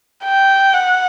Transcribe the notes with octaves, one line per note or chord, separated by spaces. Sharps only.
G5
F#5